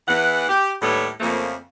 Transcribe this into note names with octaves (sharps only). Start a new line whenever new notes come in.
E2 E3 F#5
G4
D#2 A2 G3 B3 A4 C#5
F2 C#3 F3 A3 A#3